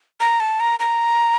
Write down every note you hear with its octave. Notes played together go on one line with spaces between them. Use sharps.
A#5
A5
A#5
A#5